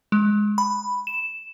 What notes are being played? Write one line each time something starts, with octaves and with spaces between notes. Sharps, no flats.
G#3
B5
E7